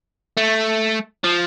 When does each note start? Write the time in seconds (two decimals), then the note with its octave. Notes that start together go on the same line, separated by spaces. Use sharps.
0.37 A3
1.24 F3